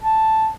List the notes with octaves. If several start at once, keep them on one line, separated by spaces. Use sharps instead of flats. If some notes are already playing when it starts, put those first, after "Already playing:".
A5